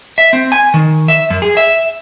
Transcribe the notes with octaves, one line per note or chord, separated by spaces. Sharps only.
E5
C4
G#5
D#3
E5
F#2
G#4
E5